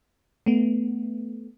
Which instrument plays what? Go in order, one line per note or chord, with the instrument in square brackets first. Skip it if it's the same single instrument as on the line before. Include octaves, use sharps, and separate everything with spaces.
[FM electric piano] A3 B3